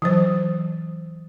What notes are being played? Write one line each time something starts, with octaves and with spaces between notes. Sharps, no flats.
E3 F#3 C5